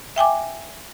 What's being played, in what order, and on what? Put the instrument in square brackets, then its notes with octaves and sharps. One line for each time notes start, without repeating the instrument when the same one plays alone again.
[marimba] E5 G5 G#5 D6